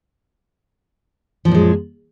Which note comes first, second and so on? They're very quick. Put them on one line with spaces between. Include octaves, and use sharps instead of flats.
F3 A#2 F#2 G#3